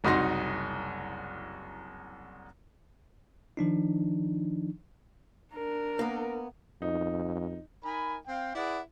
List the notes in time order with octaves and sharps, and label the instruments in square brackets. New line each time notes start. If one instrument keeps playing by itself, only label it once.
[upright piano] F#1 C2 D#4 F#4 C6 A#6
[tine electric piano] D#3 F3 D4 D#4
[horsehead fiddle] D4 A#4
[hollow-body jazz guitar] A#3 B3
[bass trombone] F2 [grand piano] D#4
[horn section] D#4 A#4 G#5 B5
C4 F5 G5
E4 G#4 B4 D5 F#5